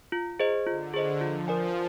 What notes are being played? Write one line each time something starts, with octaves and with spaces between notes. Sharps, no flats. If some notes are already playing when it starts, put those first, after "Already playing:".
F4
G#4 C5 D#5
D3 F4
G#4 C5 D#5
F3 F4
A#4 D5 G#5